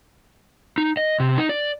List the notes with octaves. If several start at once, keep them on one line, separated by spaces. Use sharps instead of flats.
D#4
D#5
C3
D#4
D5